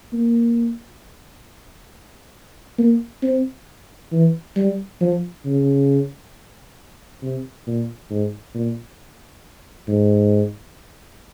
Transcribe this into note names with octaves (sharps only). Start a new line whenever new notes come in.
A#3
A#3
C4
E3
G3
F3
C#3
C3
A#2
G#2
A#2
G#2